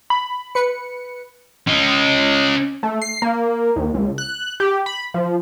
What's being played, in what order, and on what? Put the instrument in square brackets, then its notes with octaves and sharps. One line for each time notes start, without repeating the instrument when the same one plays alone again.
[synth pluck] B5
[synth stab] B4 C#7
[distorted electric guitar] C#4 D#5
[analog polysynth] A3
C7
A#3
D#2
C#2
F#6
G4
B5
F3